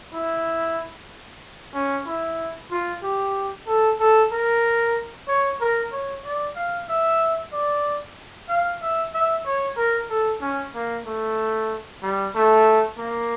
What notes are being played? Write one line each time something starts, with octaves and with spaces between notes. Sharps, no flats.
E4
C#4
E4
F4
G4
A4
A4
A#4
C#5
A#4
C#5
D5
F5
E5
D5
F5
E5
E5
C#5
A#4
A4
C#4
A#3
A3
G3
A3
A#3